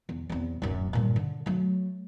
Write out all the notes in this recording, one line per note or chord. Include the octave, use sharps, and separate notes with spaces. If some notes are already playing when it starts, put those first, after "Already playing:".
E2
E2 C4
D1 F#2
G2 A#2
D3
F#3 A3